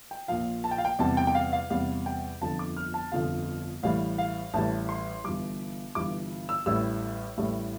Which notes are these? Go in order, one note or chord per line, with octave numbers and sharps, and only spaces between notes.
G5
A#1 A#2 F3 F5
A5
G5
F5
G5
E2 C3 G3 A5
G5
G5
F5
F5
E2 C3 G3 F5
G5
G1 F2 D3 F3 A5
D6
F6
A5
G1 F2 D3 F3 F5
A1 A2 E3 G3 F5
F5
A1 A2 E3 G3 A5
C6
G1 G2 E3 G3 D6
G1 G2 E3 G3 D6
E6
A1 A2 G3 E6
A1 A2 G3